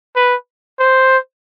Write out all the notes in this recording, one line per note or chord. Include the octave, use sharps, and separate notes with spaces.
B4
C5